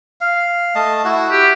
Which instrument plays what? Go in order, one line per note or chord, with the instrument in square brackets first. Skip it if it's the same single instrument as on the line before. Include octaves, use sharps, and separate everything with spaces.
[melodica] F5
A3 D#5 A5
E4 F#4 F#5
[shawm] G4